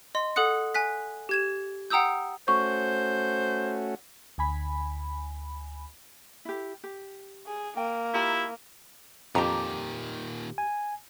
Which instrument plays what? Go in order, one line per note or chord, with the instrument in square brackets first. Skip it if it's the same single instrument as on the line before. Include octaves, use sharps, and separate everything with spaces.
[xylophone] D#5 C6
A4 F#5 D#6 F#6 C#7
G#5 F#6 B6
G4 G#6 E7
F#5 G5 A#5 D#6 E6 G6
[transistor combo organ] A3 C#4 F#4 [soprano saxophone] C5 [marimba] C#6
[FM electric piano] D2 G#5 B5
[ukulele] E4 G4
G4
[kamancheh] G#4
[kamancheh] A#3 [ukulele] G5
[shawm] E4 [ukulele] F4 G4 A#5
[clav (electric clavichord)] F2 [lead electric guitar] A#2 D#3 [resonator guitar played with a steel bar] G4 A5 A#5
[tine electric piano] G#5